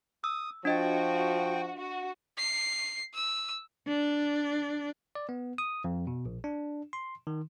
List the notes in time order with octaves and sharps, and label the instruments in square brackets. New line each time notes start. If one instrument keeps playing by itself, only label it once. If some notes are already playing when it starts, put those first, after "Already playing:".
[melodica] D#6 [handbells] E6
[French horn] F3 [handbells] D4 D#5 A6 [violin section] F#4 [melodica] G5
[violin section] F#4
[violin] C7
E6
[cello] D4
[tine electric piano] D5
B3
D#6
F2
B2
A#1
D4
C6
D#3